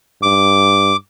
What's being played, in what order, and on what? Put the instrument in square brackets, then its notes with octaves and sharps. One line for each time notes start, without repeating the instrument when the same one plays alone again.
[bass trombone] G2 [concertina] D6